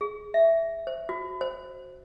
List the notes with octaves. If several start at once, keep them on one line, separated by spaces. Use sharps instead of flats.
G#4
E5
C5
F#4
C5